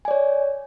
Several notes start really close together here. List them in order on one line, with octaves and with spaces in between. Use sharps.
G#5 D5 C#5